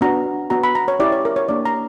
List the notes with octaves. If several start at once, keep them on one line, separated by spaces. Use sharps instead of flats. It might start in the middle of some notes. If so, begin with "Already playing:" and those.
B3 D4 F#4 A#5
B3 F#4 A#5
B5
A#5
C#5
C#4 E4 G4 D5
C#5
A#4
C#5
A#3 D4 G4 D5
A#5